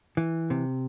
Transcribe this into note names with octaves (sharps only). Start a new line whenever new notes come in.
E3
C3